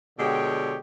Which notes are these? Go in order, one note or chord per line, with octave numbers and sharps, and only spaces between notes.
B2 D3 G#3 G4 C#5 G5